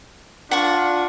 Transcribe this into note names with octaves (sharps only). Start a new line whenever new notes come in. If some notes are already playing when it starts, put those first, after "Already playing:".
D4 F4 F#5 C#6